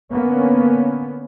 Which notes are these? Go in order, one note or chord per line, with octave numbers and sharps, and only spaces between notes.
D3 A#3 B3 C#4